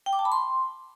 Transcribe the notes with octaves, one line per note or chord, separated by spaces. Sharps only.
G5
D6
A5
B5
C6